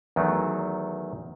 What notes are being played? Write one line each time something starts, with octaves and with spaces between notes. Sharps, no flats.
E2 D#3 F#3 A3